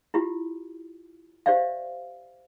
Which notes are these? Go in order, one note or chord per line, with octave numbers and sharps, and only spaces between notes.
E4 F4 G4
G4 C5 D5 E5 F5